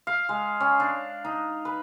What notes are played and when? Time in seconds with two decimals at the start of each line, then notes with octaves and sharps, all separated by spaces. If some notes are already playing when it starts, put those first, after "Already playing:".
0.07 F5
0.29 G#3
0.60 C#4
0.80 D4
1.24 D#4
1.65 B4